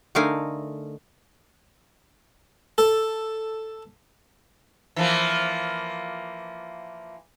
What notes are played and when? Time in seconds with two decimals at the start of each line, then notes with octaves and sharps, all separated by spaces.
0.15 D3 A3 D#4 A#4 F5 G#5
2.78 A4
4.96 E3 F3 A#3